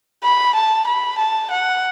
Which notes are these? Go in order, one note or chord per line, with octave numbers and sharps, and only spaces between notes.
B5
A5
B5
A5
F#5